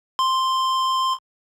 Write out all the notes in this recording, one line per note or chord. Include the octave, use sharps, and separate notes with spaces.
C6